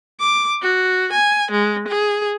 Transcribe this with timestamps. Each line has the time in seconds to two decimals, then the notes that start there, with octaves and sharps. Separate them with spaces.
0.20 D6
0.62 F#4
1.13 G#5
1.51 G#3
1.88 G#4